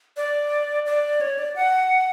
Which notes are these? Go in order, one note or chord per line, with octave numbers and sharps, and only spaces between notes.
D5
D5
C#5
D5
F#5